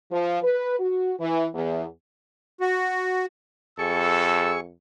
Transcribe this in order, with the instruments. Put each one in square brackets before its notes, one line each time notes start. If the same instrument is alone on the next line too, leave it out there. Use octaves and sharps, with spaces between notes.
[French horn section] F3
B4
F#4
E3
E2
[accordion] F#4
[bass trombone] F2 [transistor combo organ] G#4 C#6 [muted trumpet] A4 [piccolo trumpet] E6